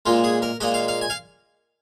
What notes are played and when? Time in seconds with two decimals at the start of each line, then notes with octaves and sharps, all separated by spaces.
0.06 A#2 G#3 F4
0.24 G#4
0.42 A#4
0.60 A#2 G#3 D#5
0.74 F5
0.88 F5
1.01 G#5
1.10 F5